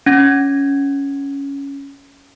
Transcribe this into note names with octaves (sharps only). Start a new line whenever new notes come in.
C#4 G#6